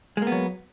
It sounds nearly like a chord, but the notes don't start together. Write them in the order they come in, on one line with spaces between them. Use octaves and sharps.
G#3 A#3 B3 F#3